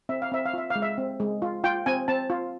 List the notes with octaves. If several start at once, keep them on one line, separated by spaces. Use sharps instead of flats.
C4 E5
F5
C4 E5
F5
F4 E5
F5
G#3
E5
C4
G#3
F4
F4 G5
C4 G#5
C4 A5
F4